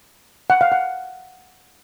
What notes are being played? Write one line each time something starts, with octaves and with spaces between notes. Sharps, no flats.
F#5
F5
F#5